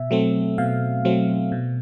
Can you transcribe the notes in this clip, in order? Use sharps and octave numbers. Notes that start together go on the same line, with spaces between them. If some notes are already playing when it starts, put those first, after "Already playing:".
Already playing: B2 E5
F#3 A3 C4
B2 F5
F#3 A3 C4
B2